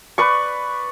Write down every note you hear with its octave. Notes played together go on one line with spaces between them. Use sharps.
B4 D5 C#6